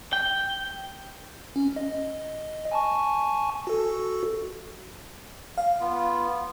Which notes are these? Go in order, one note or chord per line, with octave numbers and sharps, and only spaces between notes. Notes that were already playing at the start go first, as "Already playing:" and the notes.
G5
C#4
D#5
G#5 A5 C#6
F#4 A4
F5
B3 F4